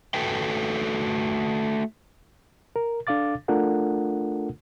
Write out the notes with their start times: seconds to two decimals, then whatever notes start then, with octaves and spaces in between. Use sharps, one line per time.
0.14 A3 F#4 A4 B4 G5
2.76 A#4
3.07 D4 A4 F5 D6 A6
3.48 A3 D4 F4 A4 A#4 F#5